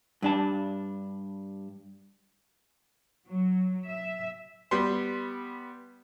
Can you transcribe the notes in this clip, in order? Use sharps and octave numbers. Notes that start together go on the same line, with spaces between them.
G2 D4 A5
F#3
E5
G3 B3 C6